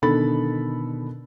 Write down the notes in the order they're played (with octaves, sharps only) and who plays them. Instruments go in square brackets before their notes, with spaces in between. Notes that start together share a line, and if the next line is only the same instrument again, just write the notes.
[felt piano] B2 D3 D#3 A4 B5 A6